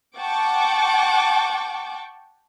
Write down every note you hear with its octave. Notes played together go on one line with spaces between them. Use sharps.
F#5 G5 A5 C#6 D6